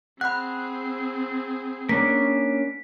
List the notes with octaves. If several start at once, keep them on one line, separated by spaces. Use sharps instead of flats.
C4 G#4 F#5 B5 F#6
A#3 C#4 D4 B6